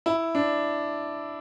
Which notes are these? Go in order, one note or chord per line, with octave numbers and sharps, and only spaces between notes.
E4
D4